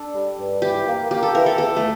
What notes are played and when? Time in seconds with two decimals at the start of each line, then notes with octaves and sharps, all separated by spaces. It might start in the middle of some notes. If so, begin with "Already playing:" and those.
Already playing: D4 A4
0.14 G3
0.39 G2
0.62 E3 G4
0.87 A#3
1.10 A#3 G4
1.23 A4
1.35 E3 A#4
1.46 A4
1.58 E2 A4
1.76 A3